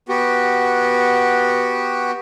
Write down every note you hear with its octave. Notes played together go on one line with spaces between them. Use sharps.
B3 F#4 G4